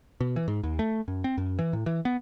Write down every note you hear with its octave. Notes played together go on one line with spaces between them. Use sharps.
B2
E3
G#2
D#2
A3
F#2
C4
F#2
E3
A2
E3
B3